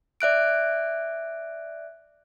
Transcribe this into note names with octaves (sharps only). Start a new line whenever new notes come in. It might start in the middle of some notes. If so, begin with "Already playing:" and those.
D5 E5 F#6 D7